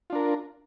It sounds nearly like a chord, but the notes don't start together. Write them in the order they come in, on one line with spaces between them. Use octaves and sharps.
F4 D4 A#4